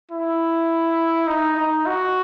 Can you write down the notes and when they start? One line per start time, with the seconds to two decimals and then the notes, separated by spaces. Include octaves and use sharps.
0.12 E4
1.27 D#4
1.57 D#4
1.87 F#4